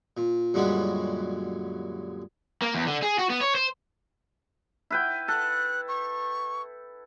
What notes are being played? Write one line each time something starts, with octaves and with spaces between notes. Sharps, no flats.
A#2
F#2 A#2 D3 G3 G#3 F#4
A#3
E2
D3
G#4
F#4
B3
C#5
C5
E4 B4 G5
A4 F#6
C#6